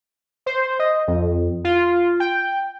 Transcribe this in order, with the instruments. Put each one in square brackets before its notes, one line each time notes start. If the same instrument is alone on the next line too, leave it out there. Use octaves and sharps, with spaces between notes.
[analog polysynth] C5
D#5
F2
F4
G5